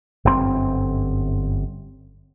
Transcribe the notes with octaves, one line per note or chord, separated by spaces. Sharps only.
G1 F#2 D3 C4